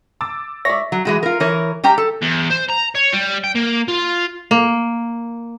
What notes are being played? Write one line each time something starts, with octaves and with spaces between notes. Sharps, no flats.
D6 E6 A6
C#5 D5 E5 A#6
F#3
E3 G#3 F#4
F4 A#4
E3 A#4 C#5
G3 G4 G5 A#5
A4
E2
C5
A#5
C#5
G3
G5
A#3
F4
A#3